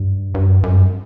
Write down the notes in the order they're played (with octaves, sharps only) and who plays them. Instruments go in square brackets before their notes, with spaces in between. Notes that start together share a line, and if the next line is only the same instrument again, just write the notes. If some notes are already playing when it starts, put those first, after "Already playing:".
Already playing: [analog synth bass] G2
G2
F#2
F#2
G2